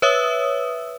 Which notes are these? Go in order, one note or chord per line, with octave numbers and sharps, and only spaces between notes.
B4 C#5 E5 D#6 E6